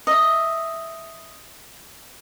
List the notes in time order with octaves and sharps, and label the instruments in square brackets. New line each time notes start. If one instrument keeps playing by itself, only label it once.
[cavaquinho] D#5 E5